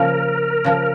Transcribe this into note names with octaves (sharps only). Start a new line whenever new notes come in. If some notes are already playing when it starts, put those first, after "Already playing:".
Already playing: C#3 F3 A#3 A#4
C#3 F3 A#3